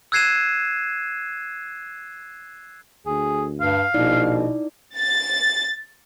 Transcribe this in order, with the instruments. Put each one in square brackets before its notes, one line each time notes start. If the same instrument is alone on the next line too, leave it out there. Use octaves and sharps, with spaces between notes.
[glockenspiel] E6 F#6 G#6 C7 D#7 E7
[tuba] D2 [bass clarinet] G#4
[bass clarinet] G2 [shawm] F5
[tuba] A#1 [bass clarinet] B2 [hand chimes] D#4 E4 D5
[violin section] A6